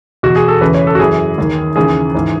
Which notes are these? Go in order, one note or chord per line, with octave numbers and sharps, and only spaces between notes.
E2 B2 F#4
G#4
A4
E2 C#3 E3 B4
C#5
A4
F#4
F#2 E3 G#4
D#2 D#3
D#2 C#3 E3 G#4
G#2 E3